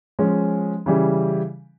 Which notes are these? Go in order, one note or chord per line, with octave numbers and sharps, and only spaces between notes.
F3 G#3 C#4
C#3 E3 G3